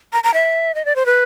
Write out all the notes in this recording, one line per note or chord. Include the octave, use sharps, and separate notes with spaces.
A#5
A#5
E5
D#5
D5
C5
B4